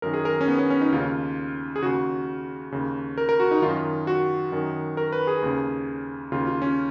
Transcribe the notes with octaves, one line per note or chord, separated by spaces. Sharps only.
F#2 D#3 A#4
G#4
A#4
C#4
B3
C#4
C#4
D#4
D#2 C#3 F4
G#4
D#2 C#3 F#4
D#2 C#3
A#4
A#4
F#4
D#4
F#2 D#3 F4
F#4
F#2 D#3
A#4
B4
G#4
D#2 C#3
D#2 C#3 F4
F4
C#4